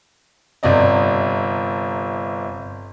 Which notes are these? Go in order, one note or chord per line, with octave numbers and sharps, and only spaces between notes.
G1 C3 D5 D#5